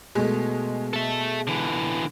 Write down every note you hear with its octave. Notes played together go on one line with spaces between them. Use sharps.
B2 G#3 A3
A4 E5
D3 E3